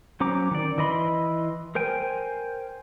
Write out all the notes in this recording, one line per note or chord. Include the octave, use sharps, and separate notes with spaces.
F#3 C#4 C5 A#5 D6
D#3 D5
E3 D#5 B5 C6
A#4 C5 G5 G#5